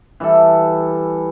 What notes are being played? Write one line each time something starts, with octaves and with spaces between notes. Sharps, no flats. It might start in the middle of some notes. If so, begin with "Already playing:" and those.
E3 G3 A4